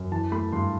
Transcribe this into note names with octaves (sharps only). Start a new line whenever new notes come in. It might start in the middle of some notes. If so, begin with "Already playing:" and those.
Already playing: F#2
E3 A5
A3 B5
G2 C6